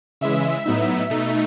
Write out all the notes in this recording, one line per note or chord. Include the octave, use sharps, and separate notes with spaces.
C#3 E3 G#3 E5
A2 F#3 B3 D#4
B2 A3 D#4